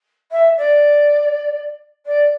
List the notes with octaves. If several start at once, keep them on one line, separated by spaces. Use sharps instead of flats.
E5
D5
D5